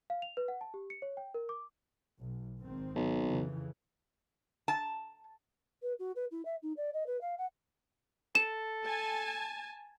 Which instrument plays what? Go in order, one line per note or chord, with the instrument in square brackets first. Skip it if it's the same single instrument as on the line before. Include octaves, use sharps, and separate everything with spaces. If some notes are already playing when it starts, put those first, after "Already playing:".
[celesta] F5
F7
B4
F#5
A5
G4
C#7
C#5
G5
A#4
D6
[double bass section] B1
G#1 D#3 C4
[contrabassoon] B1
[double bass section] F2 C#3 E3
[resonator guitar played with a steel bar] A5
[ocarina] B4
F#4
B4
E4
E5
D#4
D5
D#5
B4
F5
F#5
[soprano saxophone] A4 [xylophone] E7
[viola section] G#5 A5